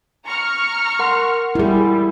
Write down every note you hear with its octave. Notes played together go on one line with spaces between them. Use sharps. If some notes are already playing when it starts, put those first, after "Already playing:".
A#5 C#6 F6
A#4 F#5 C6
G3 E4 G#4